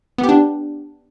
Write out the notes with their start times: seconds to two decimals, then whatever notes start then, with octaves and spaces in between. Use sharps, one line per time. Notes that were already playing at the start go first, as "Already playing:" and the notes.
0.18 B3
0.24 G4
0.29 D4